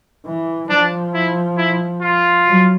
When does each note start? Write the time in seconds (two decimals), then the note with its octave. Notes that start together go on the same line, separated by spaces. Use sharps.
0.26 E3
0.70 F3 D4
1.14 E4
1.57 E4
2.02 F4
2.46 F#3